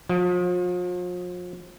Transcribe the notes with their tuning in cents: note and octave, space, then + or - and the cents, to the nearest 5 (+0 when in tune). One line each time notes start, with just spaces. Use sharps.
F3 +40